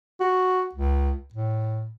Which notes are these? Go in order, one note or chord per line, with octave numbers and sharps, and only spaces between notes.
F#4
C#2
A2